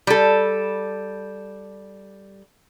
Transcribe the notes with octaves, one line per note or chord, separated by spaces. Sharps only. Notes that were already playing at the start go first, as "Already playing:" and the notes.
G3 A4